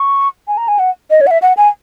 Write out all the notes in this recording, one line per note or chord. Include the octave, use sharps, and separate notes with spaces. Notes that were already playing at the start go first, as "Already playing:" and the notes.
Already playing: C#6
G#5
A#5
G#5
F#5
D#5
C#5
F#5
E5
F#5
G#5